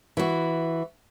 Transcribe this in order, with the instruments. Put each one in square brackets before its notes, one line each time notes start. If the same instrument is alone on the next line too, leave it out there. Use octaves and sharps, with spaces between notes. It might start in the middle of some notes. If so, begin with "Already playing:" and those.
[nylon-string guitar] E3 F#4